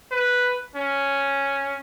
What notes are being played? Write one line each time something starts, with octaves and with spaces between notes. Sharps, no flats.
B4
C#4